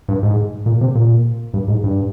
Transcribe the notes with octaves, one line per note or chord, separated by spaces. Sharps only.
G2
G#2
A#2
C3
A#2
G2
G#2
G2